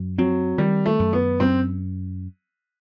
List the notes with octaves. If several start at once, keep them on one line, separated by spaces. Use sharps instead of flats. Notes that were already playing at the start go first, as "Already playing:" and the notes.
Already playing: F#2
F#3 C4
D#3 G3
A3
F#2
B3
F#2 C4